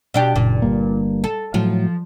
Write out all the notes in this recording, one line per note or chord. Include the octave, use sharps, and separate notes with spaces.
B2 D4 G4
F#1 A#2
G1 G2 A#3
A4
A2 F3 F#3